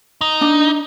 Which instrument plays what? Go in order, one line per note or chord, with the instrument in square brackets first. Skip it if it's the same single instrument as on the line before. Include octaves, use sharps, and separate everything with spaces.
[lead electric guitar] D#4
[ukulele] D4